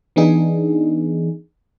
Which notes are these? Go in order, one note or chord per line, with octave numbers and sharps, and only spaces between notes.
E3 B3 D4 D#4 G#4